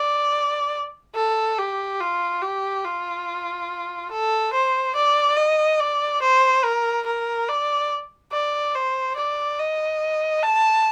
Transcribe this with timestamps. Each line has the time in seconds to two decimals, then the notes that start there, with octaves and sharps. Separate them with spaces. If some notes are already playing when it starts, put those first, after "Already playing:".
Already playing: D5
1.15 A4
1.58 G4
2.01 F4
2.42 G4
2.85 F4
4.11 A4
4.53 C5
4.95 D5
5.37 D#5
5.80 D5
6.22 C5
6.64 A#4
7.06 A#4
7.49 D5
8.32 D5
8.75 C5
9.16 D5
9.59 D#5
10.43 A5